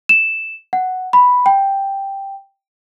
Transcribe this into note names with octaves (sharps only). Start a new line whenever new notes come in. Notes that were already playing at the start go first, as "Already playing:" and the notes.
E7
F#5
B5
G5